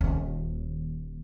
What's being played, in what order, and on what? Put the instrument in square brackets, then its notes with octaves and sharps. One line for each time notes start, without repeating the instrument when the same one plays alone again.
[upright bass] D#1 D#2